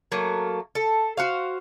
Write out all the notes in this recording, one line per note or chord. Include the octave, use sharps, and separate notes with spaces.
F#3 A3 A#3
A4
F#4 C5 F5